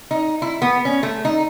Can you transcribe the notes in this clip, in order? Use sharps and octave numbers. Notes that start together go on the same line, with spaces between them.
D#4
E4
B3
C#4
A3
D#4